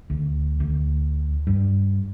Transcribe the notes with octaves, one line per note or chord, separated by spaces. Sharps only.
D2
D2
G2